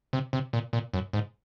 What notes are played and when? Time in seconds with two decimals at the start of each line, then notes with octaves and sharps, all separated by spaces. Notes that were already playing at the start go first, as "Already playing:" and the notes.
0.13 C3
0.33 C3
0.53 A#2
0.73 A#2
0.94 F#2
1.13 G#2